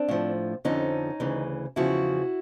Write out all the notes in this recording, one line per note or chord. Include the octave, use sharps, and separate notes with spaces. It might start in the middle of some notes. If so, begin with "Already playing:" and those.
Already playing: C4 D4
A2 F3
F2 D3 F3 C#4 D#4
D2 C#3 E3
E2 C#3 F3 E4 F#4